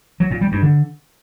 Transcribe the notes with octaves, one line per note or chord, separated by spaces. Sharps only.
F#3
A#2
G3
G2
D3